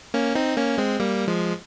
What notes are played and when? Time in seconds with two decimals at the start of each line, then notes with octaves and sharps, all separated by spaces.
0.14 A#3 C#4
0.35 C4 D#4
0.57 A#3 C#4
0.78 G#3 C4
0.99 G3 A#3
1.28 F3 G#3